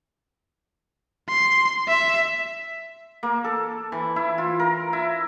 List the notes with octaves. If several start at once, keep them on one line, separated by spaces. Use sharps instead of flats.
C6
E5
A#3
A4
E3
E4
F4
A#4
E4